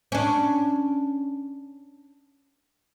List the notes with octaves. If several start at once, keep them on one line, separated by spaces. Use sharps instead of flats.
C#4 D4